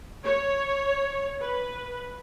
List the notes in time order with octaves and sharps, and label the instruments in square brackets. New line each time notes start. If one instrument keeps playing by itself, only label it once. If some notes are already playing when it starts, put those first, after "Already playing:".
[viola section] C#5
B4